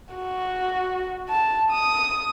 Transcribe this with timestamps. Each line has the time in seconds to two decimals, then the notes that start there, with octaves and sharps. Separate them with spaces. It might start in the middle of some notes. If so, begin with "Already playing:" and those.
0.15 F#4
1.30 A5
1.72 D#6